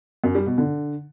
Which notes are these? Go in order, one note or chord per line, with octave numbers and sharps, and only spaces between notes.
F#2
G3
B2
D3